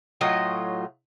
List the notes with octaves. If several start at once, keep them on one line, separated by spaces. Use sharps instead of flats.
A2 F#3 F4 D#5